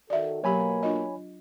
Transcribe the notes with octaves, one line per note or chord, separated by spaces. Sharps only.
D#3 F#4 A4 D5 E5
B2 F#3 A#3 G4 C#5 G#5 B5
D4 F4 D#5